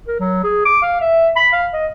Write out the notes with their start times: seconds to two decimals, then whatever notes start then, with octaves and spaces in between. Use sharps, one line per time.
0.07 A#4
0.20 F#3
0.44 G#4
0.65 D6
0.82 F5
1.01 E5
1.36 B5
1.52 F5
1.73 D#5